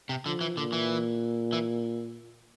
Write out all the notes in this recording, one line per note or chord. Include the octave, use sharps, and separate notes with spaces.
C3
D3 F3
E3
A#2 D3
E3
E3